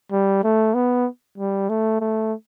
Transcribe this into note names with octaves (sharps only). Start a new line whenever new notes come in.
G3
A3
B3
G3
A3
A3